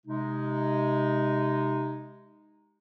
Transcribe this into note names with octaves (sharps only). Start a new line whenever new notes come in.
C3 G#3 D#4